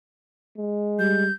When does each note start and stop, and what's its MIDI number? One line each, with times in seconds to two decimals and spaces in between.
0.58 1.25 56
0.99 1.28 55
0.99 1.33 91